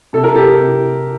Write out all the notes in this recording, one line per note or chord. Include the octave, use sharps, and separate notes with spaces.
C3 A4
A#4
G4 A4
C3